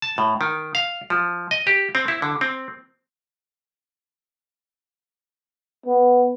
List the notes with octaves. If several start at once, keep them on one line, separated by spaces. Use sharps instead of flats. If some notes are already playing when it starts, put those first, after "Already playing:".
A5
A2
D#3
F5
F3
D#5
G4
C4
E4
D3
C4
B3